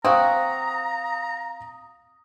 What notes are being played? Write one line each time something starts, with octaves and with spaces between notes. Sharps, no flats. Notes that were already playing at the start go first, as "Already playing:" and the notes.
C4 F#4 F5 A#5 D#6